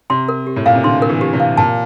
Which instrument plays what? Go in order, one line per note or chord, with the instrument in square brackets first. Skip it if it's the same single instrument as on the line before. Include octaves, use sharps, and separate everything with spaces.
[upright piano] C3 [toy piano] C6
[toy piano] A#4
G4
[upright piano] A2
[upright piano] A#2 [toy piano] F5
[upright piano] C3
[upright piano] D3 [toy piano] C6
[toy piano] A#4
[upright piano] E3
[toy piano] G4
[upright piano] C3
[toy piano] F5
[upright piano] A#2 [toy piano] A5